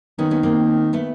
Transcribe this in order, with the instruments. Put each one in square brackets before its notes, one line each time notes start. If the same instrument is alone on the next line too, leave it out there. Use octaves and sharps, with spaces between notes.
[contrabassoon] D#3 [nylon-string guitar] B3 C#4
[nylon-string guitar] B3 C#4
A#3 C4
A3 B3